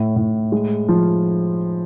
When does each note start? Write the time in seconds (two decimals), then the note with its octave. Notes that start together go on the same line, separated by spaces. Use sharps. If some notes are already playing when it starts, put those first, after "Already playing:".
Already playing: A2
0.16 A2
0.52 G#3
0.89 F3